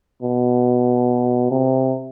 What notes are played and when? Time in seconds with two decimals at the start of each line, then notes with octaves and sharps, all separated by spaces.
0.22 B2
1.51 C3